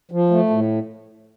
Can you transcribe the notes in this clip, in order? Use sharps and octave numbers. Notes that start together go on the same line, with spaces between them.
F3
A3
A2